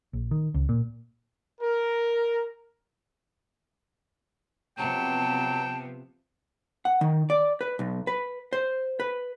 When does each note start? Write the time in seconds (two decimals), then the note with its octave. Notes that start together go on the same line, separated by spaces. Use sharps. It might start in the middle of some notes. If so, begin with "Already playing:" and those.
0.13 A#1
0.31 D#3
0.54 C#2
0.69 A#2
1.61 A#4
4.78 C3 F3 F#3 B3 G5 A5
6.85 F#5
7.01 D#3
7.30 D5
7.61 B4
7.79 B1
8.07 B4
8.53 C5
9.00 B4